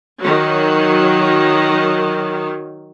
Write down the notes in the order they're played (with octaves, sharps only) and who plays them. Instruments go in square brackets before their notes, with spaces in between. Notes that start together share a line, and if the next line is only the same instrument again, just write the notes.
[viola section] D#3 F#3